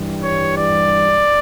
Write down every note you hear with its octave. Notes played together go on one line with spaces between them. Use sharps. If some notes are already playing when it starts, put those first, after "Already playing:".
Already playing: G2 E3 G3
C#5
D5